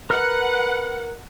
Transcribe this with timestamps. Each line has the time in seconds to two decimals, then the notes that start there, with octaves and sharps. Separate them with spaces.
0.10 A#4 B4 F#5 F6